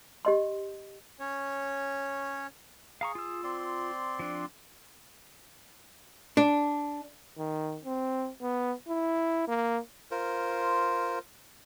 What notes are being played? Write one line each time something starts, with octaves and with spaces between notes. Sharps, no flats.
G4 D#5 C6
C#4 C#5
G#4 F5 A#5 C#6
F4 E6
C4 D5 C6
F3 D4
D4
D#3
C4
B3
E4
A#3
F4 A#4 C5